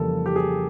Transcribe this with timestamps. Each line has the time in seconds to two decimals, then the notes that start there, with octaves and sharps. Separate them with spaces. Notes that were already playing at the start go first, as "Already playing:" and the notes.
Already playing: F2 C#3 E3 G3 A#3 A4
0.26 G4
0.36 G#4